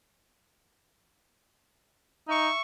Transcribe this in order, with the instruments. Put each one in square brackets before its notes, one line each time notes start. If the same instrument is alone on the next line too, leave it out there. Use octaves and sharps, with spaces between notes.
[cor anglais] D#4 [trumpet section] E5 C#6